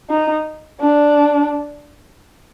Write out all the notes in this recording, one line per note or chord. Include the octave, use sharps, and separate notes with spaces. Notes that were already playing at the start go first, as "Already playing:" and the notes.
D#4
D4